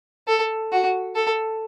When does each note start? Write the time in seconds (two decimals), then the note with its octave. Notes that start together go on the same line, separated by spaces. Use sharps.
0.28 A4
0.72 F#4
1.16 A4